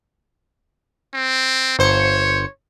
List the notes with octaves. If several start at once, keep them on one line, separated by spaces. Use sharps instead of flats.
C4
G1 C5 C#5 C#7